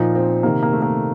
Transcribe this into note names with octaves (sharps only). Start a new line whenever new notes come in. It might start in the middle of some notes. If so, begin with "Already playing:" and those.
Already playing: A#2 F3 D#4
C4
C3 D#3 A#3
A#3
A3
A#3